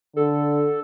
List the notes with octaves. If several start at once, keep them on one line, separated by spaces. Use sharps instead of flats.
D3 A4